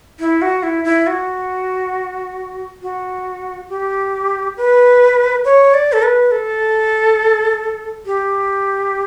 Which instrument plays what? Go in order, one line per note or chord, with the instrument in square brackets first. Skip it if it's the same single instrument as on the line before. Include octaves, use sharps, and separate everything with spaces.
[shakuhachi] E4
F#4
E4
E4
F#4
F#4
G4
B4
C#5
D5
A4
B4
A4
G4